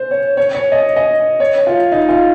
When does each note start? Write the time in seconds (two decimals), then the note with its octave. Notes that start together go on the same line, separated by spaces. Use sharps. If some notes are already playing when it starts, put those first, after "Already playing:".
Already playing: C5
0.11 C#5
0.37 C#5
0.55 C#5
0.72 D#5
0.96 D#5
1.40 C#5
1.67 F4
1.92 D#4
2.09 F4